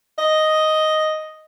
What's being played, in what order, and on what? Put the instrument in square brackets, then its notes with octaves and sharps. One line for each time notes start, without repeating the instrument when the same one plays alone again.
[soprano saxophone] D#5